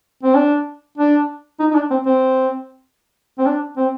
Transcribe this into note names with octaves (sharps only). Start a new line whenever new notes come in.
C4
D4
D4
D#4
D#4
D4
C4
C4
C4
D4
C4